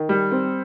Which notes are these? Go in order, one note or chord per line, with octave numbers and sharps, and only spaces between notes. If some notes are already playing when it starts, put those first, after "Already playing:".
Already playing: D#3
G3
C4